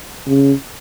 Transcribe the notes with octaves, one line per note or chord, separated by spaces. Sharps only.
C#3